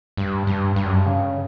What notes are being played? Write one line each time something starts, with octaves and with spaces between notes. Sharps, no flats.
G2
G2
G2
F#2
G2
C#3